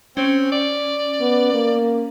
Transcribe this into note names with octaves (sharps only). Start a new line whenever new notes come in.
C4 C#4
D5
B3
A#3